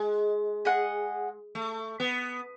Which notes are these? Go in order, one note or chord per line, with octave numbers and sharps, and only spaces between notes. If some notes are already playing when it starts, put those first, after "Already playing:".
Already playing: G#3
G#4 D#5 F#5
A3
B3